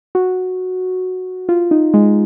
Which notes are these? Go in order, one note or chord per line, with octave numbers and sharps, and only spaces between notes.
F#4
F4
D#4
G#3